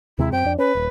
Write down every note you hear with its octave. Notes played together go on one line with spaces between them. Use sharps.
D#2 C3 G#3 E4
F#2 C4 G5
F2 D4
C#4 B4
D#1